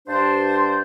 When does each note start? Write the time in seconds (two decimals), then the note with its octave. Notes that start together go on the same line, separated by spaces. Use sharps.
0.08 G2 D4 C5